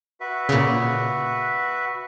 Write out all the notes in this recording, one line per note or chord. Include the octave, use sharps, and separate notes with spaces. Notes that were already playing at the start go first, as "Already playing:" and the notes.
F#4 B4 E5
A#2 C#3